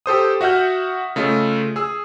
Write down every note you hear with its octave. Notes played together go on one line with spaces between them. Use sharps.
G4 A4 C5 D#6
F#4 E5 F#5 F6 G6
C#3 A3 F4 D#5
G#4 E6